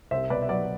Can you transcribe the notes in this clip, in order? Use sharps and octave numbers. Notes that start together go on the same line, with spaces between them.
C2 C5 E5
B2 B4 D5
E5
F#3 B4 D5